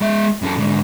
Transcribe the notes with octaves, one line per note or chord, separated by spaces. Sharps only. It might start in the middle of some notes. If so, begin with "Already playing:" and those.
G#3 E5
F#2 A4
G#2 D3